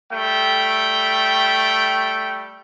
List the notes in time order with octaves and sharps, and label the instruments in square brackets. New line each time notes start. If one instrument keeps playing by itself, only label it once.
[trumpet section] G3 A3 G5